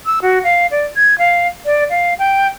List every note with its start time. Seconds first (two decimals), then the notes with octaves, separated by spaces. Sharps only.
0.06 E6
0.22 F#4
0.44 F5
0.71 D5
0.96 G#6
1.18 F5
1.65 D5
1.90 F5
2.19 G5